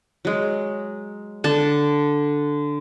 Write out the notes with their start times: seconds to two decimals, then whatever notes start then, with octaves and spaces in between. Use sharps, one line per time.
0.25 F#3 G#3
1.44 D3 A5